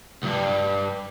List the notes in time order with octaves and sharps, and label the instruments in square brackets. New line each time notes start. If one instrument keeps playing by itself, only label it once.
[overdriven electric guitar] C#2 G2